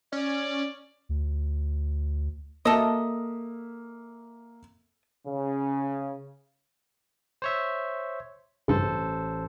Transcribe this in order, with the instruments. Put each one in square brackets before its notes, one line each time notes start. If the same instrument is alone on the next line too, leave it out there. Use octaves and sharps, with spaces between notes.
[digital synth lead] C#4 [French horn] D5
[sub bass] D2
[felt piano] A#3 E5 [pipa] A4 D#5
[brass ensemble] C#3
[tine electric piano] C5 C#5 E5
[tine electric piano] A1 A4 C5 [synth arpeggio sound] G2 C#3